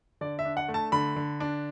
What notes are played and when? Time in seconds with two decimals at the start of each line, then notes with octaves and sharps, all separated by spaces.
0.21 D3 D5
0.39 E5
0.45 D4
0.57 F#5
0.68 A3
0.74 A5
0.92 D3 B5
1.16 D3
1.40 D4